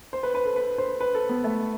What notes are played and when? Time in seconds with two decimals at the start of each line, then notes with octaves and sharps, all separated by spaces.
0.13 C5
0.23 B4
0.35 B4
0.45 A4
0.56 B4
0.78 C5
1.01 B4
1.15 A4
1.29 B3
1.44 A3